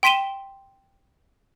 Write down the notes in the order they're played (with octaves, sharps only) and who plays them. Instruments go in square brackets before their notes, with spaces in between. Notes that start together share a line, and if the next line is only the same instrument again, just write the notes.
[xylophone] G5 C6 B6 D#7 E7 G7